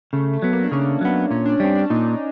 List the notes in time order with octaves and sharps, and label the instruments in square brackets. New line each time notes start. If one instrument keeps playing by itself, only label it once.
[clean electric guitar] C#3 [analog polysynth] A3
[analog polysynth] A3
[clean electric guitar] F#3 B3
[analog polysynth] A#3
D4
[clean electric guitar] C#3 [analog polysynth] C#4
[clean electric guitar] F#3 B3
[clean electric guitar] A#2 [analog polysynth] C#4
[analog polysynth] D4
[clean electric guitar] G3 C4 [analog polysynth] C#4
[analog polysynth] D4
[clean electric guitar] A#2 [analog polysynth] D#4